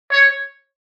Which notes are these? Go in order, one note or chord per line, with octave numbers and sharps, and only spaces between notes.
C#5